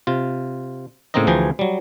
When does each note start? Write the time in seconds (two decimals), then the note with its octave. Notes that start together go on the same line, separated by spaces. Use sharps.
0.07 C3 F4
1.14 A2 C#3 A#3 C4 D#4 D#5
1.27 D2 E3 F3 G#4 G5 A#5
1.59 F#3 G3